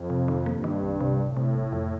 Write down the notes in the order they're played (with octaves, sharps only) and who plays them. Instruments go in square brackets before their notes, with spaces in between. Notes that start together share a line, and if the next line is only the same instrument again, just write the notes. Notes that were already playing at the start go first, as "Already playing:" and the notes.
Already playing: [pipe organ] F2
[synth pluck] C3
D#3
[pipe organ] G2 [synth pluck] A#3
[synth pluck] D#3
C2
C3
[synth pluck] G1 [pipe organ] A2
[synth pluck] C3
G1
F2